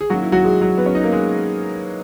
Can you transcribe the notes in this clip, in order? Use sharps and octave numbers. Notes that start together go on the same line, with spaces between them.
G#4
D#3 F#3 A#3 C#4 F#4
E4
F#3 F#4
G#3 G#4
F#3 F#4
B3 B4
C#4 C#5
D#4 D#5
A#3 A#4
G#3 G#4